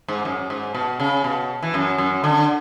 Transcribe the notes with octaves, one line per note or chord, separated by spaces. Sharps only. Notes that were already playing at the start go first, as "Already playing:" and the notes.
G#2
F#2
G#2
B2
C#3
B2
E3
F#2
F#2
D3